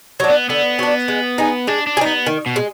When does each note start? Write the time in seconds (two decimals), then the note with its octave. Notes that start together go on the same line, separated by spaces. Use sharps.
0.20 F#3 D4
0.30 B3
0.49 D3 B3
0.79 F#3 D4
1.08 G#3
1.38 D#4 G#4
1.67 G#3 D4
1.87 D4
1.97 G#4
2.01 B3 D#4
2.27 D#3
2.46 B2
2.56 G#3